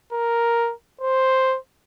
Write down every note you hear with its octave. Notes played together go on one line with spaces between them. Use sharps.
A#4
C5